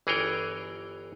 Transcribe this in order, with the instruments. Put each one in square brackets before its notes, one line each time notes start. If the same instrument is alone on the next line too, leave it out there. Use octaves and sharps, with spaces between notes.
[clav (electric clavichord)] G1 E3 G#4 A#4 C#5 G5